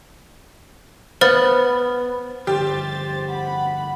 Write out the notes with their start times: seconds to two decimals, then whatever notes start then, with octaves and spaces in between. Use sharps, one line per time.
1.21 B3 C5 F6 A6
2.47 G2 D3 F3 G4 C5 A6
3.29 F#5 B5